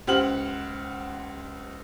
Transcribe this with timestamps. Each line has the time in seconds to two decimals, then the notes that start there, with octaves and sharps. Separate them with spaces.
0.07 C#2 G4 C5 F#5 F6 F#7